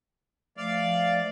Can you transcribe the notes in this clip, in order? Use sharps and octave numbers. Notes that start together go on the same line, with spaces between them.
F3 A3 D5 F5